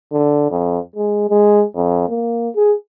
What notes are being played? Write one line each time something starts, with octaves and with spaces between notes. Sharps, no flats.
D3
F2
G#3
G#3
F2
A#3
G#4